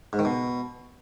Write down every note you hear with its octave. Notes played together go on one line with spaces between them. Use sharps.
G#2
D#3
B2